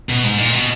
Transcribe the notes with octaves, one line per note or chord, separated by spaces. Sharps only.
B2
G#2
A#2
B2